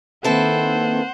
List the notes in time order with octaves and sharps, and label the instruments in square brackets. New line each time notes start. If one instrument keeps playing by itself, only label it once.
[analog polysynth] D#3 A#3 C4 [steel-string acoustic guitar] E4 A4 B4 [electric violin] C5 F#5